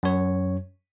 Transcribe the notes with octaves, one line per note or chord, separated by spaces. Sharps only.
F#2 C#5